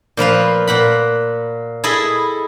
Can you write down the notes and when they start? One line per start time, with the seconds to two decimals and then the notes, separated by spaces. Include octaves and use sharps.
0.17 A#2 F3 B4 F5
0.67 A#2 F#5 B5
1.84 E4 G#4 A4 D#5 B5